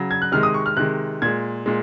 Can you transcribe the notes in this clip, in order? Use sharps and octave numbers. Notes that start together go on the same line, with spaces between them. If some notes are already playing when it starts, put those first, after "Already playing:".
Already playing: C#3 F#3
G#6
F#6
C3 D#3 G#3 F6
D#6
C#6
F6
C3 D#3 G#3 F#6
A#2 G#3 G#6
A#2 G#3